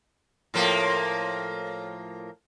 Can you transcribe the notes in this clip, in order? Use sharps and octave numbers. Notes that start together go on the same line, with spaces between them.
A2 F3 A#3